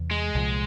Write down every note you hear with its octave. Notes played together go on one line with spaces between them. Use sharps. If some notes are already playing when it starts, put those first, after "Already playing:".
Already playing: E2 C3
G#3
C2 A#2 F3